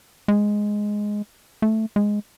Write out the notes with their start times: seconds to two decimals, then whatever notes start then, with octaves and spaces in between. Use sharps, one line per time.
0.28 G#3
1.62 A3
1.96 G#3